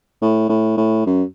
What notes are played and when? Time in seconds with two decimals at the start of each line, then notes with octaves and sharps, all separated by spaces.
0.22 A2
0.49 A2
0.77 A2
1.06 F#2